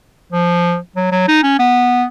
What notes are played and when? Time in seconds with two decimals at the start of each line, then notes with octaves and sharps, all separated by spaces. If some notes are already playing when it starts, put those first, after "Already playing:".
0.33 F3
0.96 F#3
1.12 F#3
1.28 D#4
1.43 C#4
1.60 B3